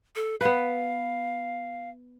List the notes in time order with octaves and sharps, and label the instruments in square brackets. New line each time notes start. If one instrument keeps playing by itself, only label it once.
[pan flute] A4
[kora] B3 B4 [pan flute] F5